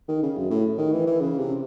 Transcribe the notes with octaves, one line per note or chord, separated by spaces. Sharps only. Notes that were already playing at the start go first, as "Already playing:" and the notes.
D#3
C#3
F#2
A2
D#3
E3
E3
C#3
C3